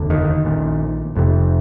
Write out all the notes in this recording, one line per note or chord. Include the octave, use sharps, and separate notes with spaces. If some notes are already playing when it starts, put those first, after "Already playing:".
Already playing: F1 D#2 D3
D#3
A#1 A#2
F1 F2 C3